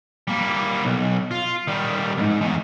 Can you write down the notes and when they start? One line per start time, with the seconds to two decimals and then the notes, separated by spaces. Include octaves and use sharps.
0.28 G3 A#3
0.85 B1
1.31 F4
1.67 D#3 G3
2.18 F2 G#2
2.41 E2 D#3